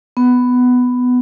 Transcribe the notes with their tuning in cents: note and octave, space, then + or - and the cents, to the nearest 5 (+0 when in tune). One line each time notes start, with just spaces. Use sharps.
B3 +10